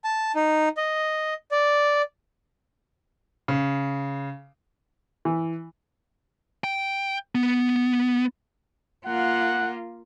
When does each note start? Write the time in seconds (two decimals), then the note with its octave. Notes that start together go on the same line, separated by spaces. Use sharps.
0.04 A5
0.36 D#4
0.77 D#5
1.51 D5
3.48 C#3
5.25 E3
6.64 G5
7.35 B3
9.06 A#3 F4 F#5